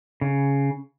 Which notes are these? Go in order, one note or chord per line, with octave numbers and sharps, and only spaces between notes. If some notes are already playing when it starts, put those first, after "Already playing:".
C#3